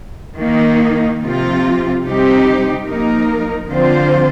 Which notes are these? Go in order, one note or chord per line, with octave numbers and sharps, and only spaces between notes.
D#3 A#3 D#4
C3 F3 C4 F4
C3 G3 C4 D#4 G4
F3 A#3 D#4 A#4
D3 F3 C4 F4 C5